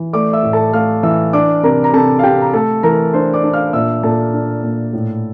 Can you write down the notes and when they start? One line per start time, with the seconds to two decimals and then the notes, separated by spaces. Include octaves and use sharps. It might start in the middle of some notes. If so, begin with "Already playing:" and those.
Already playing: E3
0.13 A3 D5 D6
0.33 E5 E6
0.43 A2
0.53 A4 A5
0.73 A3 F5 F6
1.03 E3 E5 E6
1.33 D4 D5 D6
1.63 C3 A#4 A#5
1.84 A#5
1.93 C3 A4 A5
2.19 F5
2.23 C3 G4 G5
2.42 A#5
2.53 A3 A4 A5
2.83 E3 A#4 A#5
3.13 D4 C5 C6
3.34 D5 D6
3.44 D4
3.53 F5 F6
3.73 A#2 E5 E6
4.03 A#2 A4 A5
4.33 D4
4.64 A#2
4.93 A2